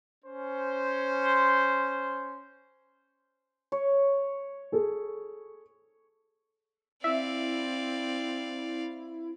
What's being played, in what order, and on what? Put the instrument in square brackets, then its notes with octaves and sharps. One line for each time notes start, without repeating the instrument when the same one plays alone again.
[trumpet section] C#4 C5
[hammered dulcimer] C#5
[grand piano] G#4 A4
[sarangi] C4 [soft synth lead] E4 [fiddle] D5 F5 [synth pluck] E5